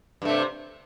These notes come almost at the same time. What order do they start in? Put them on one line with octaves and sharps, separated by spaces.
G2 A3 C3